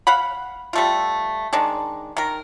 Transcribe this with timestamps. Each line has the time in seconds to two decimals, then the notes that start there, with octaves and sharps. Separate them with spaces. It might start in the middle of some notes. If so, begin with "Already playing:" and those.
0.07 F5 F#5 B5
0.73 G3 A3 F4
1.53 D#3 G#3 D4
2.17 D#3 A#4